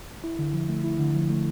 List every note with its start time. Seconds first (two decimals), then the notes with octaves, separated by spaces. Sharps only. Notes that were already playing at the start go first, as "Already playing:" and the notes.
0.24 E4
0.39 D3
0.53 F3
0.69 A3
0.84 E4
1.00 D3
1.15 F3
1.30 A3